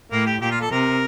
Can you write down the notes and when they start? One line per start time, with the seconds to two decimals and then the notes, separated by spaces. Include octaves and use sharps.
0.12 A2 A#3
0.26 G4
0.41 A#2 G4
0.51 F4
0.61 A4
0.71 C3 A#4